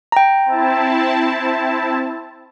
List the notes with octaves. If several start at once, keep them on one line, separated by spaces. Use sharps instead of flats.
G5 A#5
C4 E4 A5